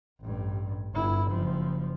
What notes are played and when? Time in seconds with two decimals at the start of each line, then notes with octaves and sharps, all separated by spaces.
0.21 A1 G2
0.94 G1 E4
1.31 F#1 F3